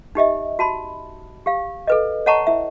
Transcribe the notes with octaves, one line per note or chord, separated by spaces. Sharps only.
D#4 G4 D#5 E5
F#4 A5 B5
G4 F5
A4 B4 D#5
C#5 D#5 F#5 A5 A#5 C#6
E4 E5